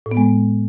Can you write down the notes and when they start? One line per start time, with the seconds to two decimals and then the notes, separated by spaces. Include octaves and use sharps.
0.06 A2
0.11 B3
0.17 G#3